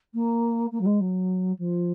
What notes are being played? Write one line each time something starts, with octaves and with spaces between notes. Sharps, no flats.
A#3
A#3
F#3
G#3
F#3
F3